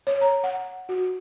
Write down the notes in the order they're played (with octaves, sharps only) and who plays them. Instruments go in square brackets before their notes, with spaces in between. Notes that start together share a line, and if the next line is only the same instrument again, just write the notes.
[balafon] C#5
A#5
F#5
F#4